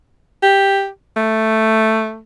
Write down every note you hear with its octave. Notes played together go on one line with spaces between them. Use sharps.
G4
A3